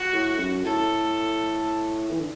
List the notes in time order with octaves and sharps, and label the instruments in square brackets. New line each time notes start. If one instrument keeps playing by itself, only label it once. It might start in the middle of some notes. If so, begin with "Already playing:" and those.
Already playing: [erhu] F#4
[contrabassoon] A2
F#2
[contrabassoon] A2 [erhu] A4
[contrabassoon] E3
D3